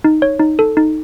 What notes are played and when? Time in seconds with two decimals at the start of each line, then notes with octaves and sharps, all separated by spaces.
0.04 D#4
0.22 C#5
0.39 D#4
0.59 A4
0.77 D#4